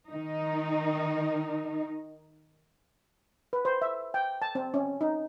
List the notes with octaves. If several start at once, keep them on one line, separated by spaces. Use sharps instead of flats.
D#3 D#4
B4
C5
E5
G5
A5
C4
C#4
D#4